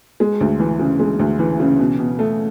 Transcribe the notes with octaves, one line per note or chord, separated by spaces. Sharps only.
G#3
D2
E3
C#3
G#3
D2
E3
C#3
B2
B2
A3